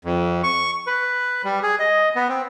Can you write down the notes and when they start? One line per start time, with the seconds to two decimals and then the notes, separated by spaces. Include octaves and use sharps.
0.05 F2
0.43 C#6
0.87 B4
1.44 G3
1.63 G#4
1.79 D#5
2.16 B3
2.29 C4